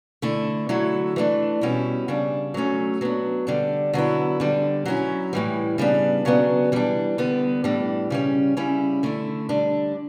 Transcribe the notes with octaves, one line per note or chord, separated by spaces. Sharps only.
D3 A3 E4
D3 F#3 A3 E4
E3 A3 D4
B2 G3 C#4 E4
C#3 G3 D4
F#3 A3 C#4
F#3 B3 D4
D3 G3 D4
D3 F#3 B3 E4
D3 G3 D4
F#3 C#4 E4
A2 E3 G3
C#3 G3 B3 D4
C#3 F#3 B3 D4
E3 G3 D4
D3 G3 B3
A2 E3 G3 D4
C#3 G3 C#4
C#3 G3 C#4 E4
D3 A3 E4
D3 G3 D4